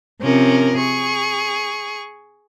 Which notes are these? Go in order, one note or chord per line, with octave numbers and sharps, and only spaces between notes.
C3 F3 C#4 A#4
G#4 C#6